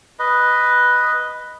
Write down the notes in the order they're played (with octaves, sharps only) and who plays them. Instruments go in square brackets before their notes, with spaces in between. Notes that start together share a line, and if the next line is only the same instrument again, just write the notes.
[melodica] B4 D#5